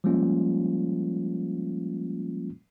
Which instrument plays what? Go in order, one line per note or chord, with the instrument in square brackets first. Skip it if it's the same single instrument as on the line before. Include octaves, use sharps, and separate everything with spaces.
[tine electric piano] F3 G3 G#3 A#3 C#4 F4